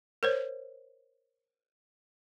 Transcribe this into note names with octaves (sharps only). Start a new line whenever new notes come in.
A#4 C5 C#5